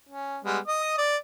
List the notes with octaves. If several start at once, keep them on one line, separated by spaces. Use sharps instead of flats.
C#4
G3 G#3 B3
D#5 D#6
D5